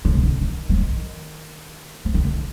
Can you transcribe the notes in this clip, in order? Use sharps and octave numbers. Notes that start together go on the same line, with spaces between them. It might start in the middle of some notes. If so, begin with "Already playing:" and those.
D3
C3
D3
D#3
F3
D#3
F3
D#3
D3